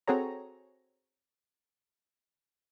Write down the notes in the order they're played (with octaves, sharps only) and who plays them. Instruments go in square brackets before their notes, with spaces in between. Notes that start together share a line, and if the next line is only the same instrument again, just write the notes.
[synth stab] C4 F#4 G#4 A4 C#5 A#5